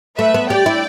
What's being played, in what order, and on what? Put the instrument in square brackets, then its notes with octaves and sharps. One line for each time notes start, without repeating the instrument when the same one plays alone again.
[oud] A3 [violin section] B4 E5
[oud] B3
[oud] G4 [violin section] D5 G5
[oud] E4